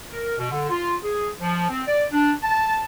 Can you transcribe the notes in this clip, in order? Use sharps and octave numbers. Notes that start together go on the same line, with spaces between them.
A#4
B2
D3
F4
G#4
F3
C4
D5
D4
A5